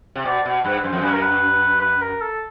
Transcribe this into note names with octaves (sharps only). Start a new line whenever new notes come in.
C3
B2 D5
B2
G2 B4
F#2 C5
F2
F#2 B4
A#4
B4
B4
A#4
A4